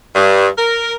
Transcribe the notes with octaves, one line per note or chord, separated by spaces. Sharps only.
G2
A#4